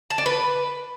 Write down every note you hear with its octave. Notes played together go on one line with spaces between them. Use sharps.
A5
D5
B4